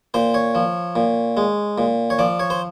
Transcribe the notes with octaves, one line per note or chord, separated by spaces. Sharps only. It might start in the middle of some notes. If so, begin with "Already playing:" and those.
A#2 C5
C#5
F3
A#2
G#3
A#2
C#5
F3 D5
C#5
C5